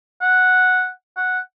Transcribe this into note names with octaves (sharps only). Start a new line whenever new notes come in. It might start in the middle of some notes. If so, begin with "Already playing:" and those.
F#5
F#5